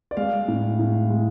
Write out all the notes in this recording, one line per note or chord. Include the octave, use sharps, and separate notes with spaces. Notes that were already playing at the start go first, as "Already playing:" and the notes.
D5
G#3 F5
A2
A2
G#3